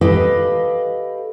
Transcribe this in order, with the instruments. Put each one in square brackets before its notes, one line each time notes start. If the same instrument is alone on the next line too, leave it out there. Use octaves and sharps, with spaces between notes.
[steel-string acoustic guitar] G4 A4 B4 D#5 F5